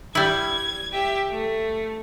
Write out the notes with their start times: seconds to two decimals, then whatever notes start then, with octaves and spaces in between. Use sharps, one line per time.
0.15 G3 E4 G#6
0.92 G4 E5
1.30 A3